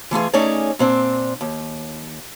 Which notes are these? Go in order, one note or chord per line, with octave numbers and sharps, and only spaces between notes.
E3 A3 F4 G#4
A3 C#4 D#4 G#4 C#5 D5
A#2 C4 D4
D#2